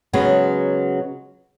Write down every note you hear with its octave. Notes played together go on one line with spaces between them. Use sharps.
C#3 F#3 G#3 B3